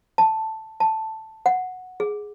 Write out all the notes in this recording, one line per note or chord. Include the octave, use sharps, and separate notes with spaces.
A5
A5
F#5
G#4